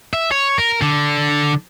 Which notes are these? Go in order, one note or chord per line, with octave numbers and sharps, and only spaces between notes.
E5
C#5
A#4
D3